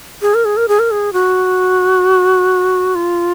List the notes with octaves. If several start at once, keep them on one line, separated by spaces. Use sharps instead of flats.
G#4
A#4
G#4
A#4
G#4
A#4
G#4
F#4
F4